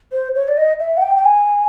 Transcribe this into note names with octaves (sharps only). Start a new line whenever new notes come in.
C5
C#5
D5
D#5
E5
F#5
G5
G5
G#5